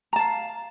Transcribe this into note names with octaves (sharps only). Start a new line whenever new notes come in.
F5 A5 A#5